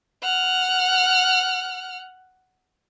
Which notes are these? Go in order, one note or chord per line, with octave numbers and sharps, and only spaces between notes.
F#5 F6